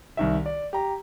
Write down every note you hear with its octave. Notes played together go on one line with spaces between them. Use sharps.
C2 D#3 E5
D5
G4 A#5